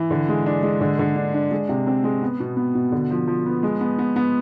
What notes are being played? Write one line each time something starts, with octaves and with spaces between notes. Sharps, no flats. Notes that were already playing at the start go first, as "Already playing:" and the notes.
Already playing: E3
D3
G#3
D4
G#3
D3
D3
D4
D4
G#3
C3
C4
G#3
B3
B2
B3
B2
D3
F3
F3
B3
G#3
B3
B3
B3